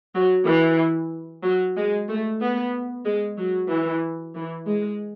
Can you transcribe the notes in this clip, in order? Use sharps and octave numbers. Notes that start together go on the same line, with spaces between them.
F#3
E3
F#3
G#3
A3
B3
G#3
F#3
E3
E3
G#3